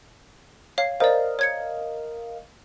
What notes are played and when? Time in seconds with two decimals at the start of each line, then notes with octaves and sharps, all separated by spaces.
0.78 C#5 F5 C7
1.00 A#4 C5 D5 D#5 F5
1.39 C#5 G#6 C#7